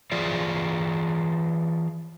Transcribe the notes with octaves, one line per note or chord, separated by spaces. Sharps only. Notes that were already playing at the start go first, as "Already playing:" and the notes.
E3 F4 G#4 D5